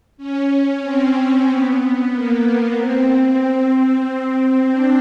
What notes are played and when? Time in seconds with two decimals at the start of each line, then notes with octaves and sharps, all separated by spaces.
0.17 C#4
0.82 C4
1.46 B3
2.11 A#3
2.43 B3
2.76 C4
3.40 C4
4.69 D4